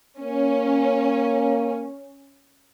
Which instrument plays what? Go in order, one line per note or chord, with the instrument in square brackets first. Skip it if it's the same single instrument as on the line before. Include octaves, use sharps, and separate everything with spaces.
[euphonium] A#3 [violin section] C#4